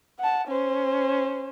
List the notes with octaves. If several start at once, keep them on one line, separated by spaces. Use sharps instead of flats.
F#5 A5
C#4 C5